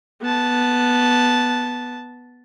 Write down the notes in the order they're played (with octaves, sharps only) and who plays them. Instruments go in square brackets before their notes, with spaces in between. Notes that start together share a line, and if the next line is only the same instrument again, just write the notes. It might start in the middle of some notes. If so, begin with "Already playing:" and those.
[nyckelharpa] B3 A5